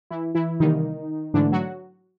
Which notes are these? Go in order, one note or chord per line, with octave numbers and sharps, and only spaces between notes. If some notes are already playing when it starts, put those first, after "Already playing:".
E3 E4
E3 E4
C3 D#3 E3 G3 A#3 D#4
G#2 D3 E3 A3 D4
F#3 F#4